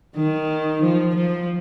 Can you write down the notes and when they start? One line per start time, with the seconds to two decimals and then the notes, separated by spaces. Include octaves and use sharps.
0.16 D#3
0.83 F3
1.16 F3